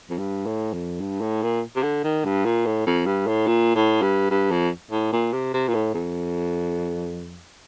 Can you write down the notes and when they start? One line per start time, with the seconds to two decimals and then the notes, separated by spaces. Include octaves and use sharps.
0.10 F2
0.18 G2
0.46 A2
0.73 F2
1.00 G2
1.21 A2
1.42 A#2
1.76 C3
1.83 D3
2.04 D#3
2.25 G2
2.45 A#2
2.66 A2
2.86 F2
3.06 G2
3.27 A2
3.47 A#2
3.75 A2
4.02 G2
4.30 G2
4.51 F2
4.91 A2
5.12 A#2
5.33 C3
5.54 C3
5.68 A#2
5.74 A2
5.94 F2